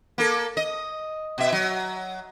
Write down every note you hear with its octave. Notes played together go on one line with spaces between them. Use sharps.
A#3 A4
D#5
B2 E5
F#3